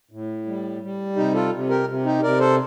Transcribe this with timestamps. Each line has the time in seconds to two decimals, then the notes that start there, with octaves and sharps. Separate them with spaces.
0.11 A2
0.46 G3
0.81 G3
1.16 C3 D#4 G4
1.34 F4 A4
1.52 C3
1.69 G4 A#4
1.87 C3
2.05 D#4 G4
2.22 C3 A#4 D5
2.40 A4 C5